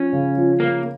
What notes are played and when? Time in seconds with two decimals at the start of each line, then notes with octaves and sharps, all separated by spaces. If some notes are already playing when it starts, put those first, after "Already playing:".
Already playing: F3 C#4
0.12 C#3
0.37 F3
0.60 C#3 A#3